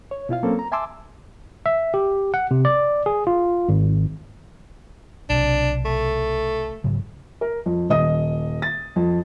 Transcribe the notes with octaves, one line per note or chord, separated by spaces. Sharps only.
C#5
B2 E4 F4 F5
F#3 A#3 C4 C#4 A4
A#5
E5 G#5 A5 C6 D6 E6
E5
G4
F#5
C3
D5
G#4
F4
G#1
B1 C3 D4
A3
G#2 C#3 F#3
A#4
F2
D#1 D#5 D#6
A6
F2